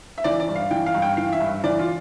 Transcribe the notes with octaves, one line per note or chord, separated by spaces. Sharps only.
E5
E3 D5
D5
G2
F5
E3 G5
F5
G2
G5
E3 F5
E5
G2
E3 D5
F4